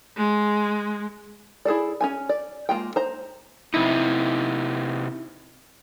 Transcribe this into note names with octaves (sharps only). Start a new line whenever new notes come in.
G#3
E4 G#4 A4 D5
C#4 E4 G#5
D5
G#3 A#3 F4 G5
C5 A#5
C3 D#4 E4